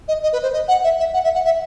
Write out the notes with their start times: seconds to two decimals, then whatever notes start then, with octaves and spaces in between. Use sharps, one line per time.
0.08 D#5
0.23 D#5
0.33 B4
0.43 C5
0.53 D#5
0.68 F#5
0.84 E5
0.99 E5
1.14 F#5
1.24 E5
1.34 F#5
1.45 E5